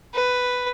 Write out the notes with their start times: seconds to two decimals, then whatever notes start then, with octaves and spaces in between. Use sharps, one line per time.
0.14 B4